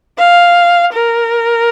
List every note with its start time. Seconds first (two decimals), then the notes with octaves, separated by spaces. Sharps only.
0.18 F5
0.93 A#4